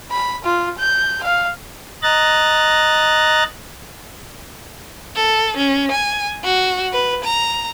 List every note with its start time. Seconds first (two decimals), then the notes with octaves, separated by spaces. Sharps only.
0.11 B5
0.44 F4
0.79 G6
1.23 F5
2.03 D#5 A#5 F#6 A6
5.15 A4
5.57 C#4
5.91 G#5
6.44 F#4
6.93 B4
7.24 A#5